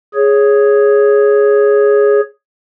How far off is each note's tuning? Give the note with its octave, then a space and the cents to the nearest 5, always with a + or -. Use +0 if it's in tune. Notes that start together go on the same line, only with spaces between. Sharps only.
G#4 +0 C#5 +0